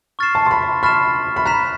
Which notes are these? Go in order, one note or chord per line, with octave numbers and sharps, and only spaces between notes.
C#6 F6 A6 C7 E7
A5
C6
B5
B5 C#6 F6 A6 C7 E7
B5
A#5 F#6 B6 E7